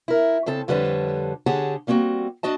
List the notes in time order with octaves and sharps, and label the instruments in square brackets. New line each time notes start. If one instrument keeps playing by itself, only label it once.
[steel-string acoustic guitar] E4 A#4
C#3 C4 A4 A5
F2 D3 G3 B4 C#5 A5
D3 G4 G#4 C#5 F#5 A5
G3 A#3 C4 F4 F#4
D4 F#4 D#5 A5